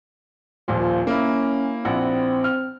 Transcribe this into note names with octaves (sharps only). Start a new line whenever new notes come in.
D#1 A#2 F3
A#3 C#4 E4
A#1 C4 E4 F#5
F6